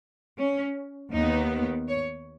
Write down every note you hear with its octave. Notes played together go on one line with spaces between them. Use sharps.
C#4
D#2 D#3 B3 D#4
C#5